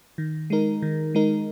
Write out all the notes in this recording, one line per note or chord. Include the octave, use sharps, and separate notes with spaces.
D#3
G#3 D#4 A#4
D#3
G#3 D#4 A#4